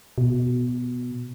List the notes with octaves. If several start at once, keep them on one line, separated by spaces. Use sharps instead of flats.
B2